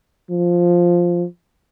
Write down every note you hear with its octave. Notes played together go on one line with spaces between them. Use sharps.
F3